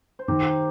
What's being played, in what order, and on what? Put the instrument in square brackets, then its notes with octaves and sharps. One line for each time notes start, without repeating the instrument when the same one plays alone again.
[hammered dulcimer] C5
[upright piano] D#3 [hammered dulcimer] G4 A#4